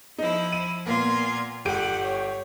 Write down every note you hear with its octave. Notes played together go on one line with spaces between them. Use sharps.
F3 D#4 E4
D#7
A#2 A#3 B3 F4 G#6
G1 G4 F#5 D7
C#5